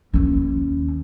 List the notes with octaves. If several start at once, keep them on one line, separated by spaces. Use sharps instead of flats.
D#2 C#4